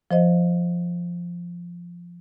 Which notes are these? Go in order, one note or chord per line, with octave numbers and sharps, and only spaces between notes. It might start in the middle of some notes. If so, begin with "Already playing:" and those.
F3 C5 D#5